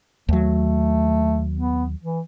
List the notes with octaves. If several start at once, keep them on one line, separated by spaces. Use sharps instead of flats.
D#2 F#3 A3
B3
E3